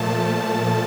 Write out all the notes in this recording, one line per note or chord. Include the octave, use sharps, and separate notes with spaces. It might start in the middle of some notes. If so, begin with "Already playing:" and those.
Already playing: A#2 F3 A3 A5